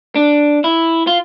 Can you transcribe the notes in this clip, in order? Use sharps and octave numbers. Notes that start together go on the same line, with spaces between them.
D4
E4
F4